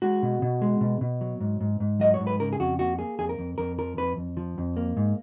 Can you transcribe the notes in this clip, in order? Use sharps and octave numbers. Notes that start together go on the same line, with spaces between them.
G#3 F#4
B2
B2
G#3
B2
B2
F#3
G#2
G#2
G#2
F#3 D#5
C#5
G#2
B4
C#3 A#4
G#4
F2 F#4
A#3 F#4
A#3 G#4
F2 G#4
A#4
F2
F2 A#4
F3 A#4
F2 B4
F2
F3
F2
A#3
G#2